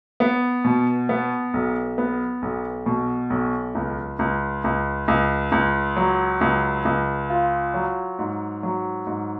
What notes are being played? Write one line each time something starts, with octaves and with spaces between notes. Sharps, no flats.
B3
B2
B3
B1
B3
B1
B2
B1
C#2
C#2
C#2
C#2
C#2
F#3
C#2
C#2
F4
F#3
G#2
F#3
G#2